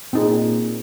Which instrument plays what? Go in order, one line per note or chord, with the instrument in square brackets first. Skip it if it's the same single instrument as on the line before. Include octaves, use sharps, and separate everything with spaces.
[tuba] A#2 [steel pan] C4 D#4 G#4